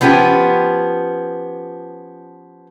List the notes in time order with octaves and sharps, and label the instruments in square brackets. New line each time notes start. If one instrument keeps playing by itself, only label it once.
[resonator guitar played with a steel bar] F3 B3 C#4 G4